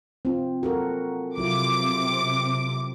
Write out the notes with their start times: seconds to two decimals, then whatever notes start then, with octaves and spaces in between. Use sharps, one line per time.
0.25 C4 F4
0.63 F#4 A4 A#4
1.38 C3 F#3 E4 F4 D6